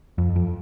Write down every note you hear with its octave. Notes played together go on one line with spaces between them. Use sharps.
F2
F2